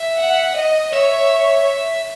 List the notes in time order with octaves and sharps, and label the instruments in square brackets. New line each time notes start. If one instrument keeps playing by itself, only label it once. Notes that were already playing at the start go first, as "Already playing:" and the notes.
Already playing: [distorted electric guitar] E5
[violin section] F#5
D#5
[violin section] C#5 [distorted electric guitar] E5